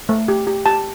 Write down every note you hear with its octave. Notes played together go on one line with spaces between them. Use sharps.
A3
G4
G4
G4 A5